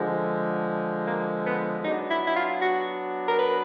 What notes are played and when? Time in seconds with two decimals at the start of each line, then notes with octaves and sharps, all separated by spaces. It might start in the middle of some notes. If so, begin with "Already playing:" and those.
Already playing: D3 F3 G#3
1.07 A#3
1.46 B3
1.84 F#3 B3 D4 D#4
2.10 E4
2.27 E4
2.36 F4
2.62 F#4
3.28 A#4
3.39 B4